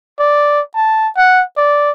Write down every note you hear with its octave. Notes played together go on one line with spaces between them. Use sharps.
D5
A5
F#5
D5